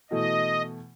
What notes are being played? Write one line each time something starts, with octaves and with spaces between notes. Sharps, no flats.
B2 E3 A3 D#5